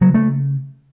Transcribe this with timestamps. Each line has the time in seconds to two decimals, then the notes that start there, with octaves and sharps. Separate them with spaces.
0.01 C#3 F#3
0.14 A3